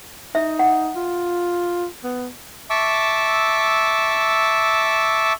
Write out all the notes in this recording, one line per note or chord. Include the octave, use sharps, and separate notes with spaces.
D#4 E5
F#5
F4
B3
E5 A5 C#6 D6 E6